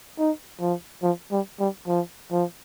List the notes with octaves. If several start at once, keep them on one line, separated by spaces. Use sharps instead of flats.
D#4
F3
F3
G3
G3
F3
F3